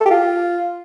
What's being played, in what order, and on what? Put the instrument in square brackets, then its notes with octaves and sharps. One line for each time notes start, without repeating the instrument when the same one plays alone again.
[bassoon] A4
G4
F4